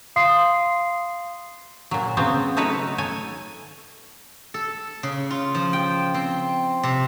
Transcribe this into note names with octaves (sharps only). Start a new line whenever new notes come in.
F5 C6 D#6 C7
A#2 F#3
C#3 F#3 B3 C4
A3 D#4 F#4 B4 C#5
A4 C#5 G#5
A4
C#3
F4
F3
G5
C4
C3